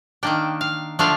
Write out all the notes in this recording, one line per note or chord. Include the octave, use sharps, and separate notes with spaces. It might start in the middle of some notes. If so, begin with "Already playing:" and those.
D#3 A#3 D4 G5
F5
D3 F3 A3 D4 F5